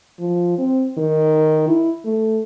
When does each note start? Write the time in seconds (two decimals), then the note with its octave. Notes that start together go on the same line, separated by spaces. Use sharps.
0.19 F3
0.58 C4
0.97 D#3
1.68 E4
2.05 A3